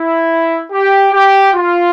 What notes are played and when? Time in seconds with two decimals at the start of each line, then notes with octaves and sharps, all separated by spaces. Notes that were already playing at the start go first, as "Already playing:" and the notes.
Already playing: E4
0.72 G4
1.12 G4
1.54 F4